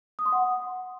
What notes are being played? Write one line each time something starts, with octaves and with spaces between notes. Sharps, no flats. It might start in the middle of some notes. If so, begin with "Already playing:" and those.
D#6
C6
F#5